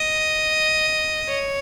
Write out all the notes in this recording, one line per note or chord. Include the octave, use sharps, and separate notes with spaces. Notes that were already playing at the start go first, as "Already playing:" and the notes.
Already playing: D#5
C#5